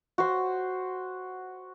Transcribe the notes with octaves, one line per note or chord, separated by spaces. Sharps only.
F#4 C5